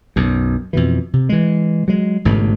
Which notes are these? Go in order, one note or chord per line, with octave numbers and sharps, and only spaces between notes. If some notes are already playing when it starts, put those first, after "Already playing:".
B1 F#2
F2 B2 E3
C3
E3 G#3
F#3 G#3
A1 G#2 B2 D3